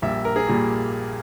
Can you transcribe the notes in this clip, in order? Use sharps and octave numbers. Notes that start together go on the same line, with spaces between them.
A#1 A#2 G3 A#3 E5
A#4
G#4
A#2 G3 A#3